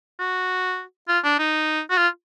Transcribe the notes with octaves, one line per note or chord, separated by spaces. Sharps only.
F#4
F4
D4
D#4
F#4
F4